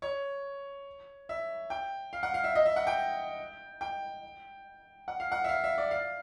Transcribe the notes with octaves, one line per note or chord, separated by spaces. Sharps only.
C#5
E5
G5
F5
F#5
F5
E5
D#5
E5
F#5
G5
G5
F#5
F5
F#5
E5
F5
E5
D5
F5